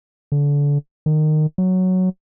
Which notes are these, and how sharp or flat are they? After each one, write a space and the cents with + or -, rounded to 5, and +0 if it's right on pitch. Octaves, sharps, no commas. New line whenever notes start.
D3 -30
D#3 -20
F#3 +0